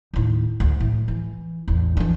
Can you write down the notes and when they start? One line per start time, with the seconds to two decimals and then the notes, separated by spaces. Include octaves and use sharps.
0.13 D#2 A2
0.60 D2
0.80 A2
1.08 E3
1.68 A1 E2
1.97 E3 D4